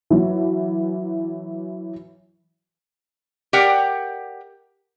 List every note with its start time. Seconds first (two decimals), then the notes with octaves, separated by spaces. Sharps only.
0.10 E3 F#3
3.53 G4 A#4 D5 F#5 G5